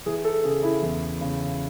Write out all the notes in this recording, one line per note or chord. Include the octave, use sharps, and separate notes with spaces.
E3 G#4
A4
C#3 G#4
E4
E2
C#3